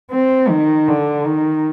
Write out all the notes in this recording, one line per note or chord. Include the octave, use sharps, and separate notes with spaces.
C4
D#3
D3
D#3